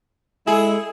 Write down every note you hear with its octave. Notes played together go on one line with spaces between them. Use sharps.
G#3 E4 G#4 A4